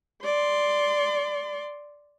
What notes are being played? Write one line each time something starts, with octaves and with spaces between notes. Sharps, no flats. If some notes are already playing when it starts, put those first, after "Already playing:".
D5 C6